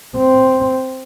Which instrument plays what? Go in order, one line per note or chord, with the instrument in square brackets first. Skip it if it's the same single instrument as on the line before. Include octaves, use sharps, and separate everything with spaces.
[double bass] C4